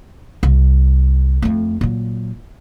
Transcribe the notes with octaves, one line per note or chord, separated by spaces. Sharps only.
C2
F2 A3
A#2 F#3